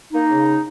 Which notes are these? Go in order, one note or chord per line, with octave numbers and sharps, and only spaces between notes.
A#3 D#4
C#3